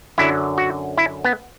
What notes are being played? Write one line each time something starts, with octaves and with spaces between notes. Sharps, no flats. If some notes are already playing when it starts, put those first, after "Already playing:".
F#2 D3 F#3 E4
F#4
E4
B3